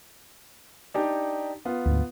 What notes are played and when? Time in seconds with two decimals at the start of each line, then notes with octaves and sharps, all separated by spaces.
0.94 D4 D#4 G4
1.65 B3 F4
1.86 D2 G#2